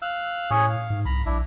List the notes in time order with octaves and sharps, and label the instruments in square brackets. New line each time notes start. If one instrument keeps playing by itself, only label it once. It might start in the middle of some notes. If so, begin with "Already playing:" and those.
[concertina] F5 E6 F#6
[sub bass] A2 [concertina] C#4 G#4 C#5
[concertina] F5
[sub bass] G#2
[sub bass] C2 [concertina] A#5 B5
[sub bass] A#1 [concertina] D4 E4